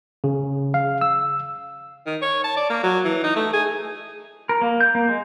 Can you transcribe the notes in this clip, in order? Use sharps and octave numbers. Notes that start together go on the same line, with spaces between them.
C#3
F5
E6
D#3
C#5
A5
D5
A#3
F#3
E3
D#4
A3
G#4
A#4
A#3
G6
A#3
G#3